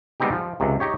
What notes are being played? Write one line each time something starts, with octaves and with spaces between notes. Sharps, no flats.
G3 G#3 B3 C4 D#4 G4
F3
C#2 C3
D#4 G4 C#5